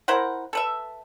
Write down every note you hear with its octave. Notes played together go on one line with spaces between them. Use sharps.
E4 A#4 C5 F#5
A4 B4 E5